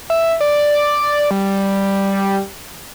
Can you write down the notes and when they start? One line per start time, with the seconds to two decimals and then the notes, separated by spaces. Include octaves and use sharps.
0.10 E5
0.41 D5
1.31 G3